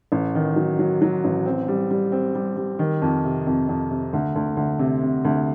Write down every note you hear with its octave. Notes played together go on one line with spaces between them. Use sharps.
A1
D#3
F#3
F#3
F#3
A1
C4
G3
G3
C4
G3
G3
D#3
F2
C3
F2
F2
C3
D2
D2
D2
C3
C3
D2